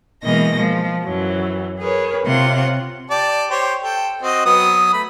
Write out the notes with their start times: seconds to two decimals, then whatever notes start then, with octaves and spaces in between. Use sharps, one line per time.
0.23 B2 E3 G#3 A#3 D#5 A#6
0.60 F3
1.04 F#2 E3 F#3
1.79 G#4 A#4 B4 C#5
2.25 C3 F4 C#5 F#5 C6
3.10 G4 D5 A5
3.50 G4 C5 C#5
3.82 A4 G5
4.22 C4 F#4 D#5
4.46 F#3 B3 D#6
4.93 A3 B5